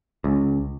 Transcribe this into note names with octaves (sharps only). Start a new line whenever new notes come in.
C#2